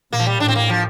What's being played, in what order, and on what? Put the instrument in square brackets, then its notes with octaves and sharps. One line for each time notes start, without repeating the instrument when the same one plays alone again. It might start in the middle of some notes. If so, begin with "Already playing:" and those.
[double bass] A#2 [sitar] A#3
[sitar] F3
G3
[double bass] A2 [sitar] D4
[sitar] C4
A#3
F3